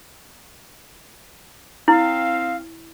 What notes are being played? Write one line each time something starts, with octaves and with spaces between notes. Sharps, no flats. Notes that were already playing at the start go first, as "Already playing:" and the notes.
C4 E4 F5